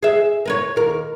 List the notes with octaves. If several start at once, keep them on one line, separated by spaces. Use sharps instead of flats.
G#4 E5
A#4 B4 C#5
D#2 A#4